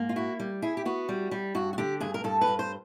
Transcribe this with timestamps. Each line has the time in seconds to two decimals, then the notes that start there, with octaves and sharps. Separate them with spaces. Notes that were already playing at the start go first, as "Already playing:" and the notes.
Already playing: G#2 A#3
0.09 F4
0.16 E4 F#4
0.39 G3
0.62 E4 G#4
0.77 G4
0.85 B3 F#4
1.09 G3
1.31 G3
1.55 G2 F#4
1.73 F#4
1.78 D3 G4
2.00 G2 G#4
2.14 A#4
2.24 G2 A4
2.41 B4
2.47 G2
2.59 C5